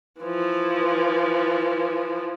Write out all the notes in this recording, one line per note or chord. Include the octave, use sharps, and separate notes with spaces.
E3 F3